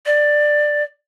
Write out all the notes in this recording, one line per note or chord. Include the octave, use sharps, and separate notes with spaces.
D5